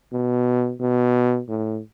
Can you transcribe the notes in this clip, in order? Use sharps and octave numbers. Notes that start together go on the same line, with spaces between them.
B2
B2
A2